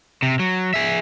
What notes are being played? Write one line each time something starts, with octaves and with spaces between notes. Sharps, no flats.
C3
F#3
G#4 E5